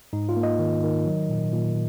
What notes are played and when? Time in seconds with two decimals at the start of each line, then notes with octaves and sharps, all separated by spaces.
0.13 G#2 D#4
0.29 F4
0.36 A#3
0.43 D#5
0.59 D#3
0.83 D#3
1.06 F#3
1.29 A#2
1.53 A#2